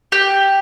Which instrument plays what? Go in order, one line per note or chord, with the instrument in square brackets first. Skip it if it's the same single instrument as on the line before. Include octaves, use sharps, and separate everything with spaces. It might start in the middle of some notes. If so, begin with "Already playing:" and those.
[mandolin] G4